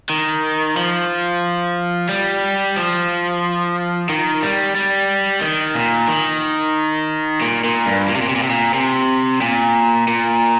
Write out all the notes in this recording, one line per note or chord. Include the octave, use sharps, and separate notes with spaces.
D#3
F3
G3
F3
D#3
G3
G3
D#3
A#2
D#3
A#2
A#2
G2
A#2
C3
A#2
C3
A#2
C3
A#2
C3
A#2
A#2